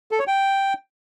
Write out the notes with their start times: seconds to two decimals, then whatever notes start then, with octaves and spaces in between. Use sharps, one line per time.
0.11 A4
0.19 C#5
0.27 G5